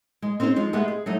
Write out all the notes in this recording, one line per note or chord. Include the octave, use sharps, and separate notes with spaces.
G#3
C4 C#4 D#4 G#4 C5
F2 F3 G#3 D#4
G#3 A3 B3 G4 G#4
G#4
F#3 G3 A3 D#4